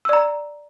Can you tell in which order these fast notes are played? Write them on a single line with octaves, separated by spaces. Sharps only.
E6 D5 A#5